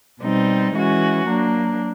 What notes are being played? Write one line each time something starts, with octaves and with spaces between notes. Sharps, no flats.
B2 G3 C4 D#4
E3 G#3 C#4 F#4
F#3 A#3 D4